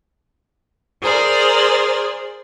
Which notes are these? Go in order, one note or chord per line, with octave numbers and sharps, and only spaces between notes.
G#4 A#4 C5 D5